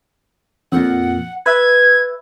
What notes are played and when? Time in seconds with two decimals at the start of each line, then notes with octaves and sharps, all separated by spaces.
0.72 F2 A#2 F#5
1.46 B4 E5 G#6